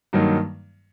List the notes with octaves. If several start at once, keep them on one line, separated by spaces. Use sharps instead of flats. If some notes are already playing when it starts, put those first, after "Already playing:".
G2 D#3 F#3 A#3 D#4